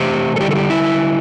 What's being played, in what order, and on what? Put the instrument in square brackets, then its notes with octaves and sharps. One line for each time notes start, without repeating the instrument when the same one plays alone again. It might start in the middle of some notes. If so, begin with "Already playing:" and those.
Already playing: [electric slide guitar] C3 E3 A3 G4 C5
A4
D3 G3 E4 G4
A4
G4
E4